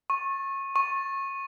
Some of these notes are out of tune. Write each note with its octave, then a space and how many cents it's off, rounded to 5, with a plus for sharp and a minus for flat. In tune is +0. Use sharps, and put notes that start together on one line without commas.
C#6 -25
C#6 -25